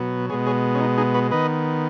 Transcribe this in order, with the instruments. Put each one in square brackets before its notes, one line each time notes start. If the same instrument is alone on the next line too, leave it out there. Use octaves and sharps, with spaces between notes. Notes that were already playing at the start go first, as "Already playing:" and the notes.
Already playing: [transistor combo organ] B2 F#3 B3
B2 G#3 B3 G#4 C#5
G#4 C#5
C#4
D#4
D#4 G#4
F#4 B4
D#3 B3 B4 D#5